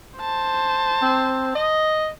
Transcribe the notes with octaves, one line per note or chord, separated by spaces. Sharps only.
C5 A5
C4
D#5